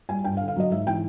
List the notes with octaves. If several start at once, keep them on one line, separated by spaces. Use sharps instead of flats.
G3 G#5
G2 G5
F5
D3
F5
F#3 D#5
G#2 E5
E3 G5